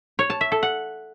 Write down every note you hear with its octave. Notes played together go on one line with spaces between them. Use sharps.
C#5
A5
E5
A4
F#5